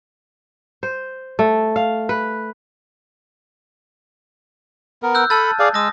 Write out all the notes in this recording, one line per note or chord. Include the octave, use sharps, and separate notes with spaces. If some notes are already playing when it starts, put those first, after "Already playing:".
C5
A3
F5
B4
B3 A#4
E6 F#6 G6
A4 A5 B5 F6 A6
G#4 D5 F5
G#3 D#6 E6 A#6